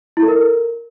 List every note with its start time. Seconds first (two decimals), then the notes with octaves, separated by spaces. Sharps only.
0.17 E4
0.22 A4
0.28 A#4